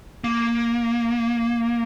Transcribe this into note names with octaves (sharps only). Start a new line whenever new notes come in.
A#3